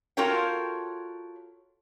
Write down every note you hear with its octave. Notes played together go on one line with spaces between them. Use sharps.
F4 F#4 A4 A#4 C#5 G5